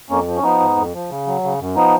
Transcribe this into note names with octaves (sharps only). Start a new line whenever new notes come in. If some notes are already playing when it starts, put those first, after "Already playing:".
F2 A#3 C#4
F3
C#4
F3 B3 D#4
G#2
F2
F3
C#3
F#3
C#3
F#2
F3 B3 D#4